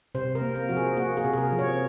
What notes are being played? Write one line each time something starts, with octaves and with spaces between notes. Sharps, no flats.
C3 C5
A#4
A#3
A#4
F3 F#4
G#4
A#3 F#4
G#4
C3
G#4
A#4
F3
C#5